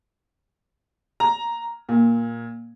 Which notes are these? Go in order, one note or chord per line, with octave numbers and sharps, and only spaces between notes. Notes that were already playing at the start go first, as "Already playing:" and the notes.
A#5
A#2